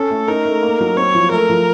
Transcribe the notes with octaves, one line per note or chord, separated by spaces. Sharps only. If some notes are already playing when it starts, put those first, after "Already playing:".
Already playing: C#4 A4
A3
D#4 A#4
A3
A#3
F#3
C4 C#5
F3
A3 A#4
F3